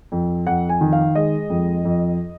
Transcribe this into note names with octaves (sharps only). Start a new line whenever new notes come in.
F2
F2 F#5
G#5
D#3
F5
G#3 D#5
F2
F2